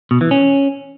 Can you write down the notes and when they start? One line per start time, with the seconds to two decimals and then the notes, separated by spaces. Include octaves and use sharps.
0.11 B2
0.21 E3
0.31 C#4